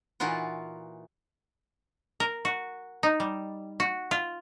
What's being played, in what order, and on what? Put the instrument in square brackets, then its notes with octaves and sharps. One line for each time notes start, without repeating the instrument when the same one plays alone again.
[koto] A#2 E3 D#4 F4 F#4
A#4
F#4
D#4
G3
F#4
F4